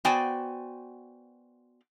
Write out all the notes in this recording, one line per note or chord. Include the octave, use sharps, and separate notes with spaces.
B3 F#4 C5 D5 G5 G#5